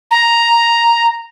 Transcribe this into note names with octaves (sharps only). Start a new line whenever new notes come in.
A#5